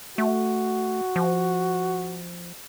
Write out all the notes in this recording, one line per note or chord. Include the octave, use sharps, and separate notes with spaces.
A3 F#4
F3